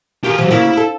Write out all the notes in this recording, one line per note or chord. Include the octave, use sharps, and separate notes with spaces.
D#3 F4 G4 G#4
C3 E3 F#3
D2 C#3 A#3 E4
A4